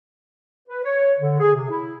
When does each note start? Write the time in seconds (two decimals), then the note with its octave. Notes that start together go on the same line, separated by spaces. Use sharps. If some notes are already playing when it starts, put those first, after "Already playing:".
0.68 B4
0.84 C#5
1.19 D3
1.39 G#4
1.54 C3
1.70 E4